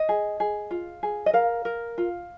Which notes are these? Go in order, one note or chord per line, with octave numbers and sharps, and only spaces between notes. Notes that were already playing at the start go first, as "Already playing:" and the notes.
Already playing: D#5
G#4
G#4
F4
G#4
D#5
A#4 F5
A#4
F4